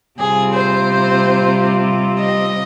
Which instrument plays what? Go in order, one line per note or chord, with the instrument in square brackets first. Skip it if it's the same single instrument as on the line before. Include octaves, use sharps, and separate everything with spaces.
[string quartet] C3 G3 C4 F4 G#4
C5
D#5